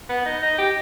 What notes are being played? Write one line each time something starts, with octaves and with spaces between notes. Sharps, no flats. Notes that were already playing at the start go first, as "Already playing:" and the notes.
B3
D#4
D#4
G4